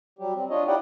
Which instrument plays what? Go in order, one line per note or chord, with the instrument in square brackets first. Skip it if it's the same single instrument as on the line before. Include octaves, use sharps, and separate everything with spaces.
[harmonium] F#3 G3 G4
C4
D4 F4 C#5 D#5
D#4 E4 G4 D5 F#5 G5